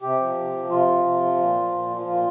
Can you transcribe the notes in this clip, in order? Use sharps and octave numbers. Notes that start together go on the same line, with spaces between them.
C3 G4
F3
C3
F3
C3 F4
F3
C3
F3
A#2
F3
A#2
F3
A#2 F4